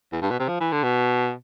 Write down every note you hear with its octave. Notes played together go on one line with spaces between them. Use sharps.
E2
G2
B2
C3
F3
E3
D3
B2